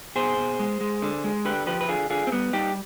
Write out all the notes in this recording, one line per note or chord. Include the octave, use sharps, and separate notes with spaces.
B2 G#4 C5
B2
G#3
G#3
D3
G#3
D3 G4 B4
F3 G4 B4
B4
D3 F4 G#4
D3 F4 G#4
C4
G3 B3
G3 D#4 G4